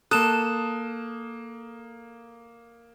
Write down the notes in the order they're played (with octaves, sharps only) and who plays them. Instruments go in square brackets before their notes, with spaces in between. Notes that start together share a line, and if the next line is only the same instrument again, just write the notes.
[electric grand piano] A#3 D#6 [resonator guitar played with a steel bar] A4 [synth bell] F#6 E7